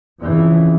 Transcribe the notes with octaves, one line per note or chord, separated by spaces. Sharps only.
F2 C#3 E3